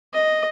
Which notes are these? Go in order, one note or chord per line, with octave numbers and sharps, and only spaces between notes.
D#5